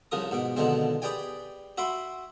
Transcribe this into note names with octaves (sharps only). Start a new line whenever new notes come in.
C2 C#3 F3 A#4 D#6
G#2 B2 D6
B2 D3 D#3 F3 G#3 C4
G4 G#4 B4 D5 G5 G#5
F#4 E5 B5 C6 D6